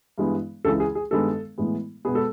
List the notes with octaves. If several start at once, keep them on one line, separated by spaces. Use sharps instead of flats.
G2 E3 G#3 B3
C#2 C#3 E3 G#3 A4
G#4
G#4
G2 D#3 G#3 B3 A4
A2 E3 G#3 B3
B2 G#3 B3 G#4
A4